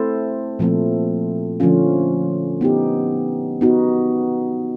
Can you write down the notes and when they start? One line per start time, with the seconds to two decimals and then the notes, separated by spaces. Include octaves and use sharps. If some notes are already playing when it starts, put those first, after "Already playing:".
Already playing: A3 C4 E4 A4 C5
0.59 A#2 F3 A3 C4
1.60 D3 F3 A3 C#4 F4
2.61 B3 D#4 G4
3.61 B3 D#4 F#4